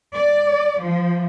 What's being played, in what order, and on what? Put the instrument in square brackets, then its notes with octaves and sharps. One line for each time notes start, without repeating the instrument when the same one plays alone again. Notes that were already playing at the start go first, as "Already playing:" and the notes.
[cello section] D5
F3